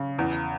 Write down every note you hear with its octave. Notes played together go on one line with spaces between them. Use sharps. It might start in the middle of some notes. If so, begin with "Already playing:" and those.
Already playing: C#3
E2